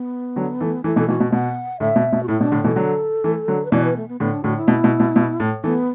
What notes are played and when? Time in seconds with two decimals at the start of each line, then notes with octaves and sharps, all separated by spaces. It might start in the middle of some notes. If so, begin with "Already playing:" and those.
Already playing: B3
0.36 D3 F#3
0.60 E3 A3
0.84 E3 A3 E4
0.96 B2 E3 A4
1.08 B2 E3 F#4
1.20 B2
1.32 B2 F#5
1.80 A2 D3 E5
1.96 B2
2.13 B2
2.23 F#4
2.28 A2 E4
2.40 B2 D4
2.52 A2 D3
2.64 B2 E3 A4
2.76 D3 F#3
3.24 E3 A3
3.48 D3 F#3
3.65 B4
3.72 B2 E3 D5
3.84 B4
3.96 A3
4.08 B3
4.20 A2 D3 B3
4.32 D4
4.44 A2 D3 F#4
4.56 E4
4.68 B2
4.84 B2
5.00 B2
5.16 B2
5.40 A2
5.64 E3 A3 B3